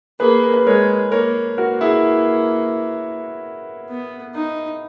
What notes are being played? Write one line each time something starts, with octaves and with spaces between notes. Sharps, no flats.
A#3 G#4 B4
A#4
B4
G#3 A#4 C#5
A#3 A#4 C#5
A#3 F#4 A#4
E4 G#4
B3
D#4